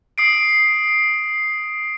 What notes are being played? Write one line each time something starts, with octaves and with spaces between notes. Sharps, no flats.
D#6 C7 D7